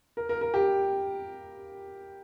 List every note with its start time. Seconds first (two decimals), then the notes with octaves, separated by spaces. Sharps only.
0.17 A#4
0.29 A#4
0.41 A#4
0.54 G4